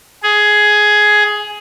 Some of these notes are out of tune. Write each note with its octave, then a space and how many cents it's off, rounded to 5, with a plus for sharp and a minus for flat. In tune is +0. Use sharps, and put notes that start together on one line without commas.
G#4 +10